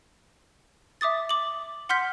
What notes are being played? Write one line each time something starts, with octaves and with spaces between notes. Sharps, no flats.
E5 D6 D#6 A6
D6 F#7
F#5 C6 F6 G6 B6